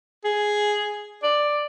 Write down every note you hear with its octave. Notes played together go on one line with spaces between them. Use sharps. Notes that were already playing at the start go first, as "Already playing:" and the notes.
G#4
D5